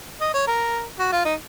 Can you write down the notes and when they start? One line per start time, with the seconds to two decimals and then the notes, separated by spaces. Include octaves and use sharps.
0.21 D#5
0.34 C#5
0.47 A#4
0.99 F#4
1.12 F4
1.25 D#4